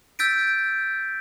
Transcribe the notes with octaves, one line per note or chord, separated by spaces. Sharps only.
E6 G6 A6 B6 D7